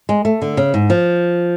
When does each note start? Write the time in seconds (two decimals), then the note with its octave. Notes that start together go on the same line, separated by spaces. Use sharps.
0.09 G#3
0.25 A3
0.42 D3
0.57 C#3
0.74 G#2
0.90 F3